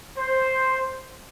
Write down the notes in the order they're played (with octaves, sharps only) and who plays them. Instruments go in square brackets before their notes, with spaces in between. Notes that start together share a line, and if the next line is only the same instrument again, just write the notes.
[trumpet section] C5